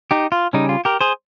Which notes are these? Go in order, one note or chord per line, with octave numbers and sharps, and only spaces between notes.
D#4 G4
F4
C#3 G3 C#4 D#4
F4
G4 A#4
G#4 C5